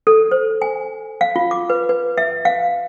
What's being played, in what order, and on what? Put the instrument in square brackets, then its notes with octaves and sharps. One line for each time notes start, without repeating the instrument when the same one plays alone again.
[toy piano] A4
C5
G#5
F5
F4
D6
B4
B4
E5
F5